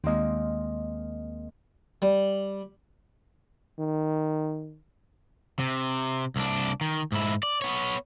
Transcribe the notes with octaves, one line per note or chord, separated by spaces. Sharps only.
D#2 G#3 A#3 C4 D#5
G3
D#3
C3
C2 D4
D#3
G#2 E4
D5
B3 C#5